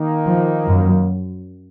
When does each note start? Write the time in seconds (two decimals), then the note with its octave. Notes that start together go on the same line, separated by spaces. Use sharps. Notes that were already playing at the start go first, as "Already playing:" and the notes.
Already playing: D#3 A#3 D#4
0.26 F3
0.65 F#2